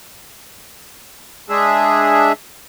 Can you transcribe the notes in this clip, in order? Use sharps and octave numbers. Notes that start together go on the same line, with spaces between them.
G#3 D4 G#4 E5